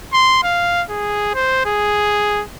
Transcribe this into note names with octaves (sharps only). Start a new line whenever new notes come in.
C6
F5
G#4
C5
G#4